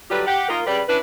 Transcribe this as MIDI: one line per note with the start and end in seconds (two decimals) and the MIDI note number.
0.10 0.22 50
0.10 0.22 54
0.10 0.22 55
0.10 0.22 65
0.10 0.22 67
0.10 0.22 71
0.26 0.49 67
0.26 0.49 78
0.49 0.61 58
0.49 0.61 63
0.49 0.61 65
0.49 0.61 70
0.67 0.81 49
0.67 0.81 55
0.67 0.81 71
0.67 0.81 74
0.88 0.98 61
0.88 0.98 62
0.88 0.98 64
0.88 0.98 71